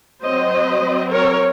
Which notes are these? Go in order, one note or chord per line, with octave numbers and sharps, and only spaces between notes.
F#3 C4 C5 D#5
F#3 C4
A#4 C#5